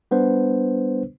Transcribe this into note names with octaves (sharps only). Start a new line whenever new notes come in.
G3 B3 D4 B4 C5